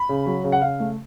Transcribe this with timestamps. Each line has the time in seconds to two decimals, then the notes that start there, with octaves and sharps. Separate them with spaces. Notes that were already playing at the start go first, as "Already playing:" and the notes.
Already playing: B5
0.09 C#3
0.26 F#3
0.44 C#3
0.52 F#5
0.62 C#3 F5
0.80 A3